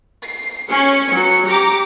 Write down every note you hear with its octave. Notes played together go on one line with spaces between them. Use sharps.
C7
C#4 C#7
F#3 C#7
G4 A#5 D6